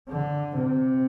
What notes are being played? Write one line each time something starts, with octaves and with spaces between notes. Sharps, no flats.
D3
C3